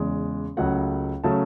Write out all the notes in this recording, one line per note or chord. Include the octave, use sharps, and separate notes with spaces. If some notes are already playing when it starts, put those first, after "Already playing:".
Already playing: E2 C#3 G#3
C#2 C#3 F#3 A3 F#5
C#3 F#3 A3 A5